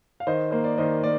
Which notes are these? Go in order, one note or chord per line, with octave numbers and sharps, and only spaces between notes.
F5
D#3 C5 D#5
A#3 C5
D5
D#3 C5 D#5
A#3 D5